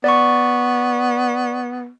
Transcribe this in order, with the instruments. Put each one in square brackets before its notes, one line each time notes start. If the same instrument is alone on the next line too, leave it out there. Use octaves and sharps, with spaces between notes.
[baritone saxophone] B3 [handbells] D5 C#6